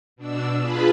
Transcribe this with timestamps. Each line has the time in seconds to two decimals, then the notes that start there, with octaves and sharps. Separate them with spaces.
0.16 B2 D4 E6
0.58 F4 G#4 B4 A5 B5